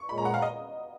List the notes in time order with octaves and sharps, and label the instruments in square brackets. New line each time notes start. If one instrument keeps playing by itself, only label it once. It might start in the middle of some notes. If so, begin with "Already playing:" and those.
Already playing: [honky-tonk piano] C#6
[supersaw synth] A#2 G#3 C#4 [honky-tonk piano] B5
[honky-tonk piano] A#5
F#5
F5
D#5